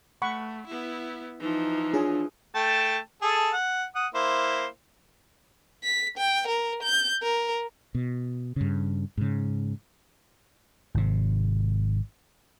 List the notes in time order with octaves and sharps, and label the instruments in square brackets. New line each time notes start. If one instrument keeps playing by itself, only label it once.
[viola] A3 [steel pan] F#5 B5 C#6 [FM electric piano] B6
[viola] B3 E4
[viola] E3 F3 [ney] D#4
[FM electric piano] D4 F4 C#5 [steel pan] G#4
[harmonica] A3 G5 A5
G#4 A4
F#5
F#5 D#6
A#3 E4 C5
[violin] B6
G5
A#4
G6
A#4
[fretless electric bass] B2
G2 C#3
G#2 C#3
[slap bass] G#1 C3